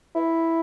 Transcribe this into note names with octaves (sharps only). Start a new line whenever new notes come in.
E4